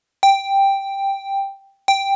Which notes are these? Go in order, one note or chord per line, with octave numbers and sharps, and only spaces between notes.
G5
G5